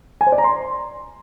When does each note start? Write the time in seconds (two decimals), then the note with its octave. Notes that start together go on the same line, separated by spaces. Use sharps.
0.21 G#5
0.27 C5
0.32 D5
0.38 A#5
0.44 C6